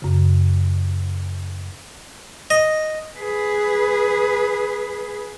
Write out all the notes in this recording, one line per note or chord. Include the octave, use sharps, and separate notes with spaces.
F#2 C#3
D#5
G#4 B4